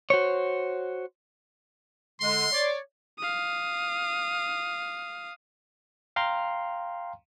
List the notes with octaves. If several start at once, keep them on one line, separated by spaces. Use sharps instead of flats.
F#4 C5 C#5
D3 G#3 C6
C#5 D5
F5 D#6
F5 G5 A#5 C6